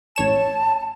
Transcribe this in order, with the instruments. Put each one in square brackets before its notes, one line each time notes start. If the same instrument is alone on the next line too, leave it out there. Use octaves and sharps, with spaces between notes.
[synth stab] A1 C#5 E7 [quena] A5